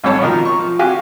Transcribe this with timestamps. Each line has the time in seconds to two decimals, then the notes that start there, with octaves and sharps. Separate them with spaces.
0.04 A1 G#2 G3 C#5 A5
0.21 B2 D#3 F3 A#4
0.45 C#6
0.59 F3
0.79 F#4 G4 F5 G#5